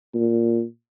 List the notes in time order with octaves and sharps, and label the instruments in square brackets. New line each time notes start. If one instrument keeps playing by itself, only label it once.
[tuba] A#2